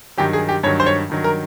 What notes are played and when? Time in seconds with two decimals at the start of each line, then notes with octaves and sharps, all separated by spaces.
0.18 G2 D#3 F#3 G4
0.33 G#4
0.49 G4
0.63 G2 C#5
0.66 D#3 F#3
0.80 C5
0.86 C#5
1.10 G2 D#3 F#3
1.24 A#4